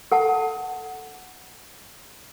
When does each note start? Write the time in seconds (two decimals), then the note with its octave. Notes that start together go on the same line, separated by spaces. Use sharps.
0.12 A4 F#5 A5